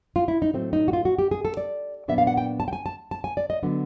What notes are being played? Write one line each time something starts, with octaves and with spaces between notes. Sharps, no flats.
F4
E4
D#4
A2 F#3 A3 C4
D#4
F#4
F4
F#4
G4
G#4
A4
D5
A#2 F#3 B3 D4 E5
F5
F#5
G5
A5
G5
G#5
A5
A5
G#5
D5
D#5
D3 F#3 B3 D4